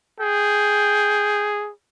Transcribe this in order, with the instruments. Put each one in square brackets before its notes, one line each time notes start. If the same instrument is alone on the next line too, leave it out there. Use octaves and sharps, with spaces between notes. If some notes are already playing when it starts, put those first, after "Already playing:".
[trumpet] G#4 [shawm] G5